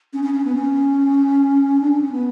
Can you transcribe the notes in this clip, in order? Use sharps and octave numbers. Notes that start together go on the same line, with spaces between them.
C#4
C#4
C#4
B3
C#4
D4
D4
C#4
B3